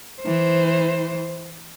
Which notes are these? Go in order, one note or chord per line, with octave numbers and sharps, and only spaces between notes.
E3 C5